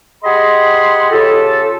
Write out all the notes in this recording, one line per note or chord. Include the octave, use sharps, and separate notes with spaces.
G4 G#4 D#5 F#5 B5 C6
C#3 F4 G4 A4